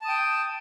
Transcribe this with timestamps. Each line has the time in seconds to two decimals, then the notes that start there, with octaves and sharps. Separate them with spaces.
0.02 A5
0.05 D#6
0.08 G5